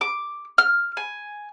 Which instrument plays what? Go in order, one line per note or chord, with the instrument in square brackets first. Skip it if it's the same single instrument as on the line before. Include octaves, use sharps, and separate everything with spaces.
[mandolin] D6
F6
G#5